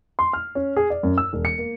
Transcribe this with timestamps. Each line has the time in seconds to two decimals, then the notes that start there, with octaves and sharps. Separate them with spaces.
0.19 C6
0.33 F6
0.55 C#4
0.76 G#4
0.90 D5
1.03 F#2
1.18 E6
1.33 E1
1.45 C#7
1.58 A#3